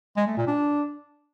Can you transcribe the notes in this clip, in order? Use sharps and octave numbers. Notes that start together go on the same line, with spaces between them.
G#3
A3
A#2
D4